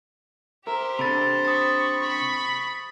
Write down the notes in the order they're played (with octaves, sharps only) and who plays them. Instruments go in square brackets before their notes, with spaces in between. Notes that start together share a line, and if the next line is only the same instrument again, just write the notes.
[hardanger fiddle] G4 C5 [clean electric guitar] A#4 [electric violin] E5
[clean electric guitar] C3 D4 [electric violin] A4 [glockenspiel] B5 A6
[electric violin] B5 C#6 [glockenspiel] D#6 A6
[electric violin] B5 C#6